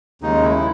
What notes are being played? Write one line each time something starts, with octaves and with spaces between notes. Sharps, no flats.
D#2 C#3 G#3 D#4
E4